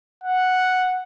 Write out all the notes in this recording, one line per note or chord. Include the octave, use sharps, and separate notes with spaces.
F#5